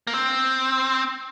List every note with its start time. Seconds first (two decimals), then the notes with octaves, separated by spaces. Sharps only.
0.07 A#3
0.14 C4